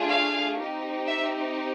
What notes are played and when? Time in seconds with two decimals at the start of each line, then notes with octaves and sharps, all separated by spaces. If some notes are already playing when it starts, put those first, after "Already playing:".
Already playing: A3 D4 F4 G#4
0.09 F5
0.58 C4 D#4 G4
1.06 E5